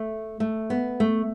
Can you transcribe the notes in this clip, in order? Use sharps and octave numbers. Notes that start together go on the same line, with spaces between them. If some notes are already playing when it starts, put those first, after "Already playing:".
Already playing: A3
A3
B3
A3